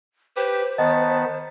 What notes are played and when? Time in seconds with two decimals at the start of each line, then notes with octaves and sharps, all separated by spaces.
0.37 G4 B4 C5
0.78 D#3 B3 D#5 A5